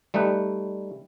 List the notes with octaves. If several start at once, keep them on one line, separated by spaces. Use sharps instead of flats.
G3 A3 D#4 B4